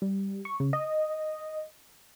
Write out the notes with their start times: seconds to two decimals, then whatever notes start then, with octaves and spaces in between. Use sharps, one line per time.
0.02 G3
0.45 C#6
0.60 C#3
0.73 D#5